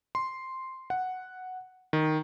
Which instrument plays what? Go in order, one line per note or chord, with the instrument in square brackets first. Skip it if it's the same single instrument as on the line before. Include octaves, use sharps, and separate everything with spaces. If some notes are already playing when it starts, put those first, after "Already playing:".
[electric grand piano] C6
F#5
D#3